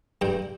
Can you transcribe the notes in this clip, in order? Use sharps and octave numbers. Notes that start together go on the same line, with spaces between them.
G2 G5